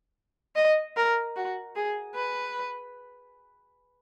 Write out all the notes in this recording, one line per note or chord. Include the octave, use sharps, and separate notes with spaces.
D#5
A#4
F#4
G#4
B4